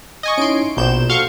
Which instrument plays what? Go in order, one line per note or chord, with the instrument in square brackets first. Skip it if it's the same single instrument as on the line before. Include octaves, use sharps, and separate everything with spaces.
[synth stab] D#5 G#5 C#6
[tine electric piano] C#4 D#4 E4 [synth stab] C6 D7
[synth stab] A#1 G6 E7 [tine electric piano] B2 C5
[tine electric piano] F#4 A4 F6 [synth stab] F5 C6 C#6